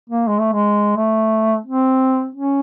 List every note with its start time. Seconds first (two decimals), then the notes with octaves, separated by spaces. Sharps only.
0.10 A#3
0.27 G#3
0.40 A3
0.53 G#3
0.96 A3
1.66 C4
2.35 C#4